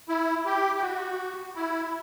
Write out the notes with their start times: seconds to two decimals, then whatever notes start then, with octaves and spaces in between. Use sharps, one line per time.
0.09 E4
0.46 G4
0.76 G4
0.82 F#4
1.55 E4